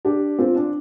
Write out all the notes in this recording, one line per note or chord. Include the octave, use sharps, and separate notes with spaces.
D4 G4
C4 F4
D4